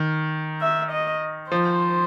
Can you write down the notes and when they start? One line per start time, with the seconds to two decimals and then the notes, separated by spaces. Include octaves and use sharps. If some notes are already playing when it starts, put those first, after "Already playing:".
Already playing: D#3
0.61 E5
0.91 D#5
1.51 F3 C5